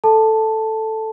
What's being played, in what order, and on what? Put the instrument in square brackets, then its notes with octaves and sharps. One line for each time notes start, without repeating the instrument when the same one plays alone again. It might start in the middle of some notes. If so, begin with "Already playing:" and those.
[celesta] A4 A5